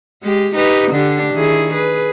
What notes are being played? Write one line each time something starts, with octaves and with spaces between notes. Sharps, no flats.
G#3 G4
D#4 G4 B4
D3 D4 G4
D#3 E4 G#4
G#4 B4